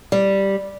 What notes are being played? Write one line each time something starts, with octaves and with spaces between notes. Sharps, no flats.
G3